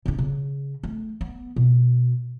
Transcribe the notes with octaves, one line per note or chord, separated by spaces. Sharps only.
C#3 D4
C#3
A3
B3
B2